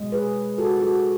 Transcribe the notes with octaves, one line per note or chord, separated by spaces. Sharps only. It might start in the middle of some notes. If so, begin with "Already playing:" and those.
Already playing: B2 G#3
G#4 B4
F#4 A4
F#4 A4